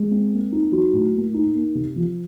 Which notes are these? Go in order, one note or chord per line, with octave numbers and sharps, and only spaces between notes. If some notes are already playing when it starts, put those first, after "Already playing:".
Already playing: G#3
C4
A#3
D#4
F#3
A2
A#3
D#4
A#3
C3
F3